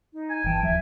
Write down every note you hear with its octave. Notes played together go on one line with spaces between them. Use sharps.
D#4
G#5
G1 E3 G5 A5
D#1 F3 F#3 E5